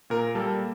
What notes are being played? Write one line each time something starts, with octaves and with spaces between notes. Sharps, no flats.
A#2 A#4
G3 A#3 A4